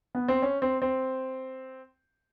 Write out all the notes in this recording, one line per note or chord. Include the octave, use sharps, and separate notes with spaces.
B3
C4
C#4
C4
C4